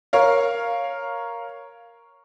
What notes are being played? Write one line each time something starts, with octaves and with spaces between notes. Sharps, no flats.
A#4 C#5 F5